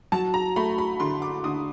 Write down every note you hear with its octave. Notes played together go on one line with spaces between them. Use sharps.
F#3 A5
A#5
A3 B5
B5
D3 C6
D6
D3 D#6